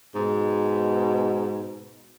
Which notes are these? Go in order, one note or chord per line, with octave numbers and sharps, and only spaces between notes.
G#2 B2